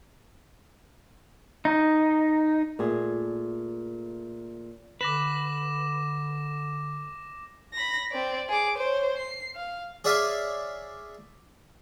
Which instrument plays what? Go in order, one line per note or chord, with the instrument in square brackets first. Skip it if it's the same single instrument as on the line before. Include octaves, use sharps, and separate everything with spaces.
[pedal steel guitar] D#4
[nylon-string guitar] A#2 A3 G#4
[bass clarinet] D3 [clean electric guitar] B4 [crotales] D6 A#6 E7
[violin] B5 A#6
C4 D5
G#4 D6
C5 C#5
C7
F5
[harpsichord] G#4 C#5 D5 E5 F5 G#5